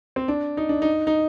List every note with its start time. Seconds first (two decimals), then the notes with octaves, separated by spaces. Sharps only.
0.16 C4
0.28 D4
0.57 D#4
0.69 D4
0.82 D#4
1.07 D#4